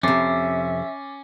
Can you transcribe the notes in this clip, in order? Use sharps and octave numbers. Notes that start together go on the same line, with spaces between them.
F2 C3 C#4 E5 D6 A6 C7